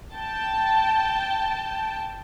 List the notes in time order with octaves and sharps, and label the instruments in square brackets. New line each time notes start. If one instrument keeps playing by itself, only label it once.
[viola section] G5 A5